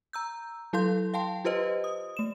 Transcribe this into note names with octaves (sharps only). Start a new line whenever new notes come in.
A#5 E6 G6
F#3 E4 A4 F5 C6 G6
F5 G5 A5 C6
F4 G4 B4 C5 D#5
D#6
A3 E7